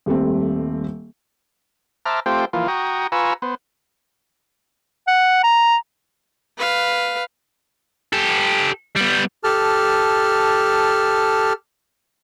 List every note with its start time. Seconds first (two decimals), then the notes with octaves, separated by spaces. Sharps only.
0.06 D#1 G3 A3 C4
2.06 C5 E5 A5 A#5 D6 F6
2.26 A3 C4 F4 G4 C5 G5
2.53 E3 F3 A#3 F4
2.68 F#4 G5 A#5 C#6 D#6
3.12 F4 B4 G#5 A#5 C#6 E6
3.42 B3 C5
5.07 F#5
5.43 A#5
6.58 B4 F5
8.13 G4 A4
8.96 G3 B3
9.44 G4 A4 A5 F6